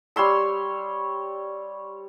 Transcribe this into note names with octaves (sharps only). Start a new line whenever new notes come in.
G3 C#5 C6 E6